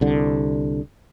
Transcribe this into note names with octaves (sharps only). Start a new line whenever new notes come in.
C2 D3